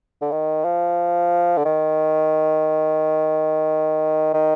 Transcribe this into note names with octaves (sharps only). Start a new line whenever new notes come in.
D3
D#3
F3
D3
D#3
D#3